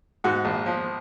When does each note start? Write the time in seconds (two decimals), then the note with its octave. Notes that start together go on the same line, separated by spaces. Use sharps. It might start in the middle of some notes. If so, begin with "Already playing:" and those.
0.24 G#2 F#4
0.45 A#1
0.66 F3